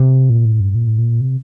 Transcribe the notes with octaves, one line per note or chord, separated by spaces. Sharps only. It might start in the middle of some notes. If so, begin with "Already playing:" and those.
Already playing: C3
A#2
A2
G2
A#2
A2
A#2
C3